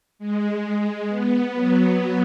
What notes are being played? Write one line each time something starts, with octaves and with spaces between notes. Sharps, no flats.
G#3
B3
F#3